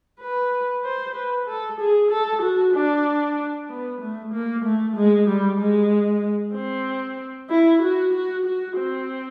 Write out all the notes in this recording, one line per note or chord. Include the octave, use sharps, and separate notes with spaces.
B4
C5
B4
A4
G#4
A4
F#4
D4
B3
A3
A#3
A3
G#3
G3
G#3
C4
E4
F#4
F#4
F#4
C4